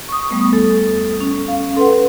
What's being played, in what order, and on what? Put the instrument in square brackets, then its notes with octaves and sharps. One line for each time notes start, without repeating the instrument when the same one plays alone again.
[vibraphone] C#6 D#6
[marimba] G3 A3 B3
[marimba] E2 [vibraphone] A4
[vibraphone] C#4
[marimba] F5
[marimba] A4 B4 F#5 [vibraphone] C6